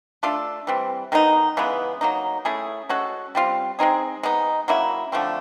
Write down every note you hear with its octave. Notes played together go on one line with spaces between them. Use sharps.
A3 D4 F4 A4
E3 G3 C4
D#3 G#3 B3 D#4
C#3 E3 G#3 B3
F#3 A#3 D#4
A3 C#4 E4 G#4
G#3 C#4 F#4 A4
G3 C4 F4
G#3 C4 D#4 G#4
G#3 B3 D#4
F#3 A#3 C#4 E4
D3 F3 A3 C4